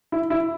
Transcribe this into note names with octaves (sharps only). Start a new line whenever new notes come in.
E4
E4